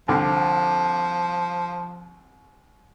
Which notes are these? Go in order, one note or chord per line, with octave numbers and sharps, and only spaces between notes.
C2 D3 F3